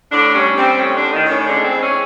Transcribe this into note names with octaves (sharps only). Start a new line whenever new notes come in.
A2 D3 D4
G3 C#4
G3 C4
A2 C#4
D3 D4
A2
D#3 D#4
A2
C#4
D3 G#3 D4
C4
E3
C#4